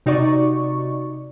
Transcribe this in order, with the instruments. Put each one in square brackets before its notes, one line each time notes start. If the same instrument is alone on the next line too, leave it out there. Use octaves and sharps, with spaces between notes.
[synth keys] C3 D#4 F#4 D5 C#6